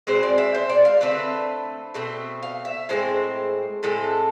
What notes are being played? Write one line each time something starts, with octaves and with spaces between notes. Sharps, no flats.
B2 G#3 C4 C5
D5
E5
C5
D5
F5
D3 A3 C4 B4
B2 A3 C4
F5
E5
A2 G#3 C4 C5
A2 G#3 C4 A4